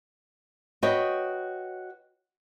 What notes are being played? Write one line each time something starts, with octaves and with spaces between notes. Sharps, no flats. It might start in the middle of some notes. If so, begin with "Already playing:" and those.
F#4 B4 C#5 D#5 G5